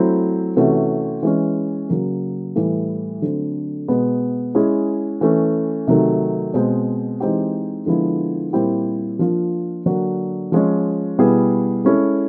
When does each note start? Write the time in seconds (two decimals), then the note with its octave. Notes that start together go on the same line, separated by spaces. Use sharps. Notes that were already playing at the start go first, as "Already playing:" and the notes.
Already playing: F#3 A3 C4 E4
0.56 C3 E3 A3 C#4 F#4
1.23 E3 G#3 C#4
1.89 C#3 F#3 A#3
2.56 A2 E3 G3
3.22 D3 F#3 A3 C4
3.88 B2 G#3 B3
4.55 G#3 C#4 E4 G#4
5.21 E3 A3 C#4
5.87 C3 D#3 F#3 A3
6.54 B2 G#3 C4
7.20 E3 G#3 C4 D#4 G4
7.86 D3 F3 G#3 B3 E4
8.53 A#2 G3 C4 E4 G4
9.19 F3 A#3 D4 F4
9.86 D3 F#3 A#3 D4 F#4
10.52 F3 G#3 C#4
11.19 B2 G3 B3 E4 G#4
11.85 G#3 C#4 E4 A4